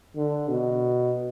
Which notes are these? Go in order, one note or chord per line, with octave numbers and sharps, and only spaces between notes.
D3
B2